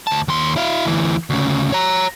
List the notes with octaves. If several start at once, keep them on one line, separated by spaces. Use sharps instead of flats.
D2 A5
D#2 C6
E4 F5
D2 E3
D2 C#3
C#5 A#5